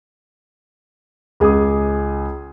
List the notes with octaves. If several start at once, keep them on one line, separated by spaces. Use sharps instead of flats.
C#2 G#4 G#5 D6 D#6